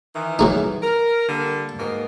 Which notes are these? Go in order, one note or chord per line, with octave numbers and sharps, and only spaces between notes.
D#3 E3
F#3 G#3 D#4
A#4
D3 G3 A#3
G#2 B2 A#3